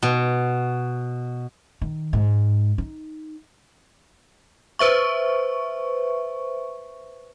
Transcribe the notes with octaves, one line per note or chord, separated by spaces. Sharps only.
B2
D#3
G#2
D#4
B4 C5 E5 C#6